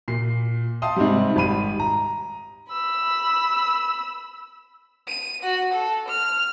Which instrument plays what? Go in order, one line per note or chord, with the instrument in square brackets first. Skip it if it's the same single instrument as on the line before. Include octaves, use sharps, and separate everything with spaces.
[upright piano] A#2 C7
F5 G5 A5 C6 D#6
G#2 C3 G3
G#1 G3 B5 D#7
A#5
[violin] B5 E6
D#7
F#4
A4
F6